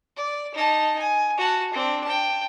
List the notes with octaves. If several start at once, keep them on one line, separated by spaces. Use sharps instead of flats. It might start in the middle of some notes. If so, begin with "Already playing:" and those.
D5
D#4 A5
G#5
F#4 A5
C4 D4
G5 A5